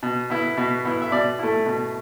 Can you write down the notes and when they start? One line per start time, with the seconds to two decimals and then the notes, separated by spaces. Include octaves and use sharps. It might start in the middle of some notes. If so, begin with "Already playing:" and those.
0.03 B2
0.30 B3 E4
0.57 B2
0.85 B3 E4
1.02 E5
1.12 B2 D5
1.39 A3 E4
1.66 B2